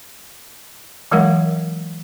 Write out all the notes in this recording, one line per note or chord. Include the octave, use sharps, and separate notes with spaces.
E3 F#3 G#3 A#4 F5 F#5